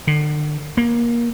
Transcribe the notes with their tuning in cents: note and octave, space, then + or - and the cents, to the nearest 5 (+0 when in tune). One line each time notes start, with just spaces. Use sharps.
D3 +40
A#3 +20